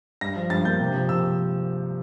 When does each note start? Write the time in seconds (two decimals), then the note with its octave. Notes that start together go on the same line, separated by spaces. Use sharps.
0.21 G2 A#6
0.36 F3
0.50 G2 A6
0.65 A#3 G6
0.80 C3
0.94 F3
1.09 C3 E6